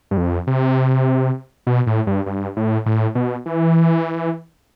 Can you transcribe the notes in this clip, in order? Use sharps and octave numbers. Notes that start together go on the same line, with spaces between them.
G2
F2
C3
B2
A2
G2
G2
A2
A2
B2
E3